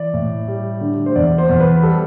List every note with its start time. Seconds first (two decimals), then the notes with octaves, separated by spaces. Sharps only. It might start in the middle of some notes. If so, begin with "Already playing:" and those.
Already playing: E3 D5
0.14 A2
0.48 G3
0.81 D3
1.06 C5
1.16 E2 D5
1.38 C5
1.50 E2
1.60 B4
1.83 G3 A4